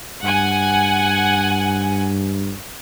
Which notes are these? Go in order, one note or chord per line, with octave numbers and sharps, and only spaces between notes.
G2 F#5 G#5